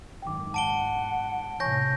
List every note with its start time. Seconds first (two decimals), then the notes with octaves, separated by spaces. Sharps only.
0.22 G#1 F#2 D#3 G5 D6
0.54 G#2 F#5 A5 D7 G7
1.60 A2 C3 E3 C#5 G#5 C#6 G6 A#6